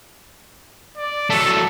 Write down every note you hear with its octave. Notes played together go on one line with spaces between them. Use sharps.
D5
F#3 A3 A4